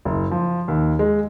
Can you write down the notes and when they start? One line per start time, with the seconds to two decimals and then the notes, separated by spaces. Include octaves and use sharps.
0.05 F#1
0.31 F3
0.68 D#2
0.99 G#3